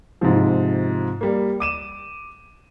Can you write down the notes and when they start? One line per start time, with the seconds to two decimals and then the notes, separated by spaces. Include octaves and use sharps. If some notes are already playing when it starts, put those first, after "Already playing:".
0.21 G#2 C3 F3
1.21 G3 A#3
1.60 D6 D#7 E7